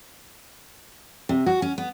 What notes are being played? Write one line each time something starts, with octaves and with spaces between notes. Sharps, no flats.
C3
F#4
C#4
B3